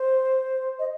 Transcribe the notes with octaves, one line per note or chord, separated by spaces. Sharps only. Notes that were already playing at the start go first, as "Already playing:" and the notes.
Already playing: C5
D#5